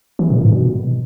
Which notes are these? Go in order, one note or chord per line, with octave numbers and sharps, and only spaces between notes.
E3
A#2
G#2
B2